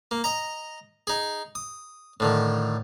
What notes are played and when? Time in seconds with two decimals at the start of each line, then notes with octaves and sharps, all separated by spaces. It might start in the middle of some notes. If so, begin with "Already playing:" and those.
0.11 A#3
0.24 D#5 A#5
1.07 D#4 G#4
1.55 D#6
2.20 A2 D3 D#3